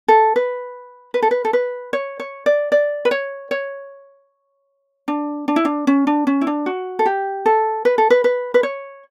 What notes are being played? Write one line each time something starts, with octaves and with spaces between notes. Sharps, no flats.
A4
B4
B4
A4
B4
A4
B4
C#5
C#5
D5
D5
B4
C#5
C#5
D4
D4
E4
D4
C#4
D4
C#4
E4
D4
F#4
A4
G4
A4
B4
A4
B4
B4
B4
C#5